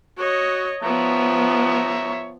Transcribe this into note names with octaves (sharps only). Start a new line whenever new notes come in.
F#4 C#5 D#5
F3 B3 C#5 E5 A#5